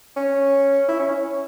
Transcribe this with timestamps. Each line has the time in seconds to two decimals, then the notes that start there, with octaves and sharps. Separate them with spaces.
0.16 C#4
0.88 E4
0.99 C#4
1.10 C#4